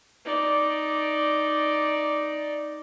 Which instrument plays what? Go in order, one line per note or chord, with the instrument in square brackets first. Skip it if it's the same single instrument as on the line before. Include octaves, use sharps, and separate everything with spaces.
[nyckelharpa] D#4 D5